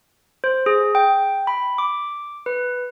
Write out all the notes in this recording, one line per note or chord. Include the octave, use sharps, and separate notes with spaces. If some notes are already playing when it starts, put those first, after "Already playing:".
C5
G#4
G5
B5
D6
B4